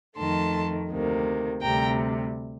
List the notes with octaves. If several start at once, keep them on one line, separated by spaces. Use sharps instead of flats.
F2 D#3 A3 A5 C6
D2 C3 D#3 A#3
D2 C3 G3 G5 A#5